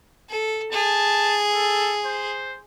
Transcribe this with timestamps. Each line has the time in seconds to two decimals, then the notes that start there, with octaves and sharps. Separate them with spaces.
0.30 A4
0.72 G#4 A5
1.52 A4
2.05 C5